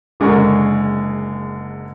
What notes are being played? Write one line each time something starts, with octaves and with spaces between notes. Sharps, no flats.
F#1 D3 G#3 G#4 A#4 C#6